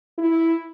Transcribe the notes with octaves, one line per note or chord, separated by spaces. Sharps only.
E4